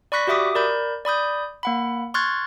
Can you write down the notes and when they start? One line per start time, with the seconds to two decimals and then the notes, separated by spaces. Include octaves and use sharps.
0.12 D5 B5 C#6 F#6 A#6 B6
0.27 F#4 G4 E5 D6 D#6
0.55 A#4 D5 B5 G6
1.05 D5 B5 D#6 G6
1.63 A#3 F#5 B5
2.14 C6 C#6 F6 F#6 G#6 A6